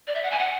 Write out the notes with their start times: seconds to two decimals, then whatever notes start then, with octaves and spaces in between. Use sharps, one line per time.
0.07 D5
0.15 E5
0.23 F#5
0.31 G#5
0.39 F#5